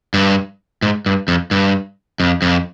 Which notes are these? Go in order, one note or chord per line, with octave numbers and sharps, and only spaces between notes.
G2
G#2
G2
F2
G2
F2
F2